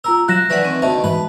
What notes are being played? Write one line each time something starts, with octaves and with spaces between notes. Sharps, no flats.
F4 A#4 A#5 E6
F#3 E4 F4 F#6 A#6 E7
D#3 E3 A3 B4 D5 F#5
C4 E5 C#6
D2 B2 D#3 E5 A5
G#2 E3 G#3 B4 B5